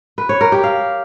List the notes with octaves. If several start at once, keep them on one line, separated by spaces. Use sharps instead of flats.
B4
C#5
A#4
G4
F5